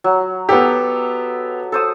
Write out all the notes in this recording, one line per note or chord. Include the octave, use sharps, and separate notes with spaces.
F#3
B3 G4 A4 D#5
A4 C5 D#6